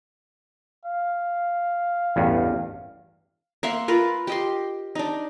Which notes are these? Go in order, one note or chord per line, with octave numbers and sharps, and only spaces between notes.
F5
A1 E2 G2
A#3 E5 F#5 C6
F4 A#4 B4
G4 D#5 C6
D4 D#4